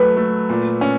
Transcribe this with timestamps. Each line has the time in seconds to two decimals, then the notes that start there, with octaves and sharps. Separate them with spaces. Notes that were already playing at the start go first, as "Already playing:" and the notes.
Already playing: F#3 A3 B4
0.17 A3
0.49 A#2
0.81 C#4